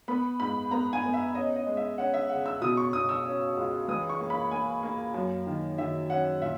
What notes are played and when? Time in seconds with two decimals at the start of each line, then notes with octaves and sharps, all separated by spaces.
0.08 B3 B5
0.40 G#2 B5
0.71 B3 A#5
0.93 G#5
1.04 B3
1.13 E5
1.35 C#4 D#5
1.56 D#5
1.67 G#3
1.77 E5
1.98 C#4 F#5
2.14 E5
2.29 C#3 F#5
2.46 E6
2.61 B2 D#6
2.77 C#6
2.93 B2 D#6
3.09 E6
3.25 C#4
3.57 C#2
3.88 E3 D#6
4.09 C#6
4.20 A#3
4.30 B5
4.51 A#3 G#5
4.83 A#3
5.14 F#2
5.46 D#3
5.78 D#3 E5
6.10 C#4 F#5
6.41 A#2 E5